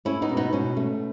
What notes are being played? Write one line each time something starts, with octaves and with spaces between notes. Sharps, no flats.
A3 C#4 E4
B3 D#4
B2
B3 D#4
B2 C#4
A3